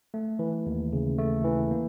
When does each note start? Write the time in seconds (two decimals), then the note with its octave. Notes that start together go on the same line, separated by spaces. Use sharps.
0.14 A3
0.39 E3
0.66 D#2
0.93 C#3
1.18 A3
1.45 E3
1.71 A#3